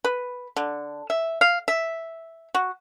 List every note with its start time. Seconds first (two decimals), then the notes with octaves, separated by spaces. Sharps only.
0.04 B4
0.56 D3
1.10 E5
1.41 F5
1.68 E5
2.54 F#4